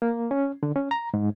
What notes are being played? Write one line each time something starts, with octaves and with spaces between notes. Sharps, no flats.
A#3
C#4
D3
C#4
A#5
G#2